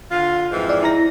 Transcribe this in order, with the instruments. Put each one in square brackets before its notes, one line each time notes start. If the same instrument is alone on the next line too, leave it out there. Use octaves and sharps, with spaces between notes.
[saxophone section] D3 F4
F2 G#2 E3
[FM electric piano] D5
E4 A#5 A#6